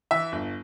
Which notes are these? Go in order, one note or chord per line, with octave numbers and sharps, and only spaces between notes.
E3 E5
G1